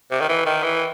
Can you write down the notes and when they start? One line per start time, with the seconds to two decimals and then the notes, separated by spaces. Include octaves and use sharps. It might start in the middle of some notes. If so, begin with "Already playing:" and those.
0.11 C3
0.21 D#3
0.29 E3
0.46 D#3
0.63 E3